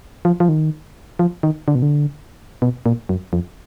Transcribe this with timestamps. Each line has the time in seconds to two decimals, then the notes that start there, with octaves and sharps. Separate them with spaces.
0.25 F3
0.40 F3
0.49 D#3
1.19 F3
1.43 D#3
1.68 D3
1.75 B2
1.82 D3
2.62 B2
2.86 A#2
3.09 F#2
3.33 F2